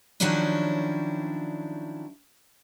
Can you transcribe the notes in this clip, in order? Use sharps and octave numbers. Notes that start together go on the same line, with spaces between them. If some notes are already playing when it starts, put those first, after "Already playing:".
D#3 F3 F#3 C#4 D4 E4